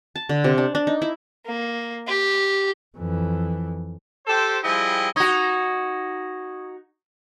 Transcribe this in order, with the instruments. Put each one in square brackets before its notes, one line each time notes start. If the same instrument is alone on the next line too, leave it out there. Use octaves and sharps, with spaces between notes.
[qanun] A5
D3
C3
D4
D4
D#4
E4
[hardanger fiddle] A#3
G4
[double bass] F2 E3
[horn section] G4 A4 C5
F3 G3 E4 G#4 D#5 G5
[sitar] D#4 F#4 [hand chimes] C#6 D#6 G#6